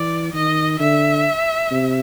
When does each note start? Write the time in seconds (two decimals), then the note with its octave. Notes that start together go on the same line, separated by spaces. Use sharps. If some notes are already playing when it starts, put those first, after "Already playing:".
Already playing: E3 D5
0.33 D#3 D#5
0.79 D3 E5
1.71 C3